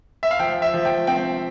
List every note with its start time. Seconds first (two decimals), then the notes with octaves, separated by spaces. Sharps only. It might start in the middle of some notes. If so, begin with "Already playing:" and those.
0.23 E5
0.31 F5
0.39 F3 G5
0.62 E5
0.74 F3
0.85 G5
1.07 C4 G5